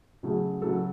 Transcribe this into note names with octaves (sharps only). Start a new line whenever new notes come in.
C#3 F#3 A3 G#4
C#3 F#3 A3 A4